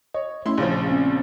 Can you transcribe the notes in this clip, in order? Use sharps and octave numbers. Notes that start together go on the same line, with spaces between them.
C#5 D#5
A3 C#4 E4 C6
A#1 C#3 F3
A#3 C4 C#4